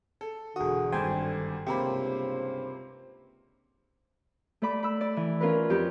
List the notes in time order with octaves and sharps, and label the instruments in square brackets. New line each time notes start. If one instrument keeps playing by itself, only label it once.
[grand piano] A4
[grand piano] E1 D#6 [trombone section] D3 [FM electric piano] F#4 G#4
[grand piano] G#1 G2 [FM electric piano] C5 G5 G#5
[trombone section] C#2 G2 C5 [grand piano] C3 A#3 B5 [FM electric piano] G4
[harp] A3 D5 B5 D6
B5 E6
D5
E3
C#4 F4 A#4 B4
F2 G4